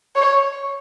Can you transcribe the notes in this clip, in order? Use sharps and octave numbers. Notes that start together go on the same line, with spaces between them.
C#5